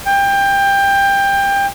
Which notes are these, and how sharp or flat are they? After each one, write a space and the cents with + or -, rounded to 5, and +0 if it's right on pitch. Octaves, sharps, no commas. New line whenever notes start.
G5 +20